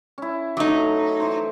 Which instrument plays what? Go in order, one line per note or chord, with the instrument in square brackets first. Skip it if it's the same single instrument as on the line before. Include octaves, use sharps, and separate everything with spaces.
[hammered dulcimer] C#4 E4
[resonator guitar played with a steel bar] F#3 D#4 [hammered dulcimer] A3 D6
[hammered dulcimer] E3 C5